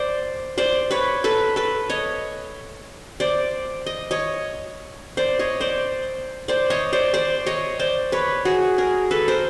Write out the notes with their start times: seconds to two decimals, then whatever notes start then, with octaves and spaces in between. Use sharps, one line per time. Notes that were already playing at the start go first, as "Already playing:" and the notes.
Already playing: C5 D5
0.58 C5 D5
0.91 B4 C#5
1.24 A4 B4
1.56 A4 B4
1.90 C#5 D#5
3.20 C5 D5
3.86 D#5
4.11 C#5 D#5
5.17 C5 D5
5.39 C#5 D#5
5.61 C5 D5
6.48 C5 D5
6.70 C#5 D#5
6.93 C5 D5
7.14 C5 D5
7.46 C#5 D#5
7.80 C5 D5
8.12 B4 C#5
8.45 F#4 G#4
8.78 G#4 A#4
9.11 A4 B4
9.28 A#4 C5